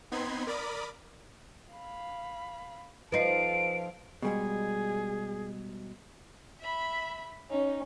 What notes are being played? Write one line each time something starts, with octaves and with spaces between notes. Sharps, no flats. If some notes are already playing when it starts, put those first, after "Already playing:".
B3 C4 D#4 B5 C6 G#6
A#4 D5 B5 D6 D#6
F5 B5
F3 D#4 A4 B4 F5 C7 D7
B2 G3 G#3 G#4
E5 B5
C#4 D#4